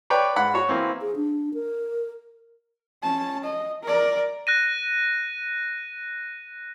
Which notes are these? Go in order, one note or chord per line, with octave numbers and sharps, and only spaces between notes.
B4 C#5 D5 G5
G#2 F#5 B5
F#4 C#5
E3 A#3 C4
G#4
D4
A#4
C#4 A5
D#5
A#4 D5
F#6 A#6 D#7